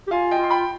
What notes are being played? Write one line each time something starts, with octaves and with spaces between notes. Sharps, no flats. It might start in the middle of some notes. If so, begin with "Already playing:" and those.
G4
F4 F5 G#5
D#5 G5
F4
C6
G5 B5